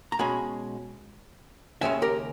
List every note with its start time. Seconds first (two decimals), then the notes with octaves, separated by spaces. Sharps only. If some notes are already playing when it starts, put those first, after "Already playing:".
0.12 A#5
0.19 B2 G#3 C#4 G#5 B5
1.81 D#2 C#3 G#3 C#4 E5 G#5
2.02 G4 A#4